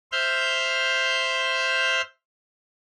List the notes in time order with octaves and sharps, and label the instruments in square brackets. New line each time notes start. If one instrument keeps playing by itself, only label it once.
[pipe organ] C5 E5 F6 G6